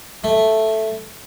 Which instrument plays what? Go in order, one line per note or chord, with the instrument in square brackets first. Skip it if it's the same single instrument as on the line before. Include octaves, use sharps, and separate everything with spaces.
[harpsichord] A3